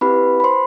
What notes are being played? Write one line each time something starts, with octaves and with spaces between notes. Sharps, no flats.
C4 E4 G4 B4 B5
B5
C5 C6